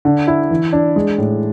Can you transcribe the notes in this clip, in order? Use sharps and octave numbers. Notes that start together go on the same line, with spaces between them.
D3
E4
E3
D4
G#3
A2